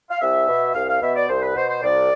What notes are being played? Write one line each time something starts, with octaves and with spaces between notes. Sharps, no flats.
F5
C2 E5
B2
C2 F5
F5
B2 E5
D5
C2 C5
B4
B2 C5
C5
C2 D5